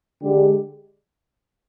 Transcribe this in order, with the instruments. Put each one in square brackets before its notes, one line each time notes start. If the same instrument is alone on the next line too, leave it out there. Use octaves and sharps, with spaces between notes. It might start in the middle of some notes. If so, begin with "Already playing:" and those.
[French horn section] D3 G#3 D4 G4